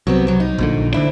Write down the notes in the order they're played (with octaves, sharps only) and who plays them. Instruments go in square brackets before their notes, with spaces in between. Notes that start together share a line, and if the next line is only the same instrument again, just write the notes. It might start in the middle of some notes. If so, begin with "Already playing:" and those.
[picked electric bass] C2 [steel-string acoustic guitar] F#3 B3 C4
[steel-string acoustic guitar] B2 F#3
D#4
[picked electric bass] A#1 A#2 D3
[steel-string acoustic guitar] D2 E4 [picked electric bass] D3 D4